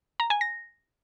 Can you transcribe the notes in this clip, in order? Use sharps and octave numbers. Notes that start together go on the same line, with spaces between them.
A#5
G#5
A#6